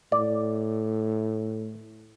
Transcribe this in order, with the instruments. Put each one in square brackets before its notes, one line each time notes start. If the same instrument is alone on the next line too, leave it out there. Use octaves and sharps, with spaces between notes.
[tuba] A2 [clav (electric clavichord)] D5